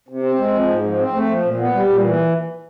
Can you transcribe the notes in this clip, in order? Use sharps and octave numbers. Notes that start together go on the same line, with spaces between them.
C3
C4
G#3
F3
G#2
F3
C4
A3
F3
A#2
B3
G3
A#2
E3